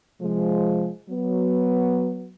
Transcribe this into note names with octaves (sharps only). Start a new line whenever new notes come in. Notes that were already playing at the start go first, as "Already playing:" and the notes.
C3 F3 G#3
F#3 B3